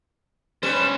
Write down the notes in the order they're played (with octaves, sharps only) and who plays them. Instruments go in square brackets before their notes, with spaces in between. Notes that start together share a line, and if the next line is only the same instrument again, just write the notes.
[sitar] G2 G3 B4 [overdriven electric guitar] C#4 C5 [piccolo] E7